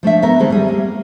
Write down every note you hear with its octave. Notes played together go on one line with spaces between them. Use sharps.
F3 A3 D4 E5
B3 A4 A#4
D2 D#3 F#3 G#3 C4 A4
G3 G#4
A#3